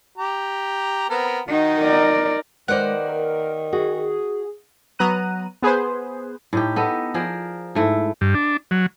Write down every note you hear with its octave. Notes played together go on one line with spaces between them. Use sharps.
G4 A#5
B3 C4 A#4
D#3 D#4 F#4
A#4 D5
D#3 G#3 A#3 B4 C5 D5 F#5
A#4
F#4 G#4
F#3 B3 A#5 F#6 D#7
B3 G#4 B4 C5
A2 D#4 G4
B3 A4 D#5
F3 G#4 A#4 D5
G#2 A3 E4
G2
D4
F#3